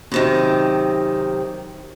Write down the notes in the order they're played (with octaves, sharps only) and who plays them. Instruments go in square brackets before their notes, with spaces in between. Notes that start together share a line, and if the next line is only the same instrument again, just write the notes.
[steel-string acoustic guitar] F#2 C3 D#3